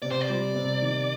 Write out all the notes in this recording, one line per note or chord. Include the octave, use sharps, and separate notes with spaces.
C3 D5
C5
D5
G3
C3
D#3